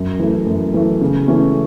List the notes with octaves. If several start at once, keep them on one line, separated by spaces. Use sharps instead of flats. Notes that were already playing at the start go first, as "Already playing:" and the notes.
Already playing: F#2
E3 A3
F#2
E3 A3
C#3
E3 A3 C#4